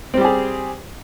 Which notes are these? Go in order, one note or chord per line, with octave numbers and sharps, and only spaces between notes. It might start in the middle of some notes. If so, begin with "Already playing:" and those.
G3 C4 G4 G#4